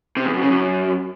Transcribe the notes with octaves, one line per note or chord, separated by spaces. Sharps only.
C3
E2
F#2
C#3
F#2